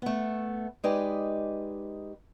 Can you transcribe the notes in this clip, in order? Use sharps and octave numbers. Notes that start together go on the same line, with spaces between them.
A3 B3
G#3 D#4 G4 B4 D5 D#5